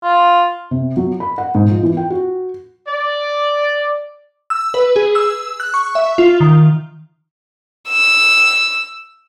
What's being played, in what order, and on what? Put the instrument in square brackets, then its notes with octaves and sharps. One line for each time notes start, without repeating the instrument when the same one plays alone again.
[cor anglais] F4
[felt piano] C3
F#3
B5
F#5
G#2
F3
E3
G5
F#4
[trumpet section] D5
[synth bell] E6
B4
G#4
E6
F#6
C#6
E5
F4
D#3
[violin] E6